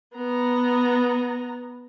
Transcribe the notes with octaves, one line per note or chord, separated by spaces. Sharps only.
B3 A#5